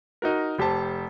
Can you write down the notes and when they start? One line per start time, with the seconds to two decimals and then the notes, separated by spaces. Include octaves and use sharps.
0.22 D#4 F#4 A#4
0.59 F1 G4 C5 A5